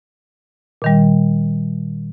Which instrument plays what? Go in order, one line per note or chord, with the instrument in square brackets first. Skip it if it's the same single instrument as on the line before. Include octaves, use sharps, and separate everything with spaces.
[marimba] A#2 D#3 G3